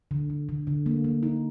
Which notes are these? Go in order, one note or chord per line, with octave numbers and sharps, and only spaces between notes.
D3
D3
D3
D3
A#3
A#3
D#4